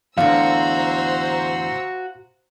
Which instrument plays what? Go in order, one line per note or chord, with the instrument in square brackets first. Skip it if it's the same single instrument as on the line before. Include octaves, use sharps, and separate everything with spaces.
[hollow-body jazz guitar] E2 A2 D3 [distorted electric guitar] F#4 [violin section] C5 A#5 E6 [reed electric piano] F5